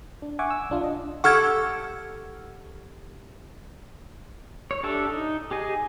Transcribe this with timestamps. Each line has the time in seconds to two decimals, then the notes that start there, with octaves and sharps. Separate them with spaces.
0.22 D4
0.39 E5 F#5 G#5 C#6 D6
0.50 E6
0.70 B1 D4 F4
0.81 D4 D#5
1.24 G4 A4 F#5 C#6 F6 G#6
4.71 C#5
4.83 D4 G4 A4 E5
5.09 D#4
5.51 G4 G#4 D#5